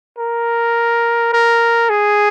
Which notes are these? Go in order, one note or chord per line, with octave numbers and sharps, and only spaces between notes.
A#4
A#4
G#4